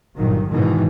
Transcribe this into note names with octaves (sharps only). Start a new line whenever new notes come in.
G1 A#2 D#3 F#3
G#2 B2 D#3 E3